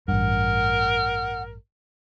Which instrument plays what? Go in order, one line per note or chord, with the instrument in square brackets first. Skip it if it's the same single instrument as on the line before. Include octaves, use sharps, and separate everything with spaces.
[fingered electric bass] A1 G2 [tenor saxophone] A#4 [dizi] F#5